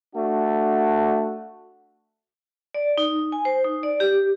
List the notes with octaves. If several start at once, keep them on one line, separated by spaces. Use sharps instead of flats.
A3 D4 F#4
D5
D#4
G#5
C5
D#4
D5
G4